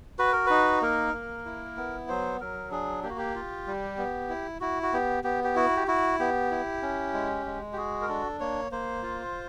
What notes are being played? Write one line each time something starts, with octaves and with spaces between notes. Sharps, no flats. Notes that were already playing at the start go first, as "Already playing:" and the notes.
F#4 B4
A#4
D#4 B4
A#3 A#4
A#3
E4
B3
F#3 C5
F#3 A#4
D4 G#4
A#3 G4
F#4
G4
F4
G3
B3
E4
E4 F#4
F#4
B3 G4
B3 G4
G4
E4 F#4
G4
E4 F#4
B3 G4
E4
C#4
G#3
G#3
G4
F#4 G#4
A#4
D4 A4
A#3 C#5
A#3 C5
F4